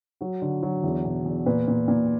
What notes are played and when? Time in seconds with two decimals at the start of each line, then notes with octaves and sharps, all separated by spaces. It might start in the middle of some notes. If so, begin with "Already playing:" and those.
0.21 F#3 F#4
0.42 D3
0.63 F#3
0.83 E2 E4
1.05 B2
1.25 E2
1.46 A#2 B4
1.68 A#2
1.88 A#2